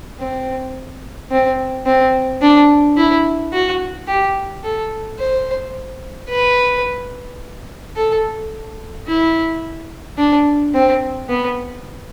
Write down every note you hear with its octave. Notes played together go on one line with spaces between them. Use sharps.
C4
C4
C4
D4
E4
F#4
G4
A4
C5
B4
A4
E4
D4
C4
B3